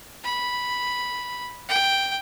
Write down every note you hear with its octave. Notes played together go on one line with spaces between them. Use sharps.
B5
G5